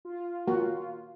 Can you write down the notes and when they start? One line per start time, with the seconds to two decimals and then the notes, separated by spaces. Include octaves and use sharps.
0.05 F4
0.48 A#3 F#4